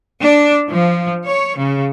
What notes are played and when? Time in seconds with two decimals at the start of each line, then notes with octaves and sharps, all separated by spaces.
0.19 D4
0.70 F3
1.26 C#5
1.58 C#3